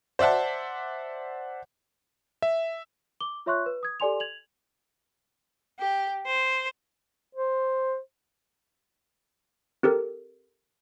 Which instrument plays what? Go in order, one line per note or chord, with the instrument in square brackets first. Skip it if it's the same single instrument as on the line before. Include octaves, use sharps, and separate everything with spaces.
[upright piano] C5 D5 E5 F#5 A5
[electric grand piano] E5
[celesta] D6 G7
F4 C#5 E5 C6 C#6 F#6
B4
D#6 G#6
G4 A4 D5 G#5 C6 F7
G#6 F7 F#7
[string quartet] G4
C5
[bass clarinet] C5
[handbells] C4 G4 A4 A#4